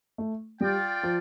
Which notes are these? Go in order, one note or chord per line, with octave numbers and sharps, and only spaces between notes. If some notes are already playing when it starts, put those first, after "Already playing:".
A3
G3 F4 D5 G5
F3